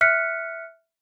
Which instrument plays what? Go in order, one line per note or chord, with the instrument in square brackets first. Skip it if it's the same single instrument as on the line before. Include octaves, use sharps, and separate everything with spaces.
[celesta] E5 F6 F#6 B6 C#7